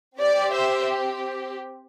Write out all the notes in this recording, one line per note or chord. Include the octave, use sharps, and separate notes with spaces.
C4 G4 D5
C5 E5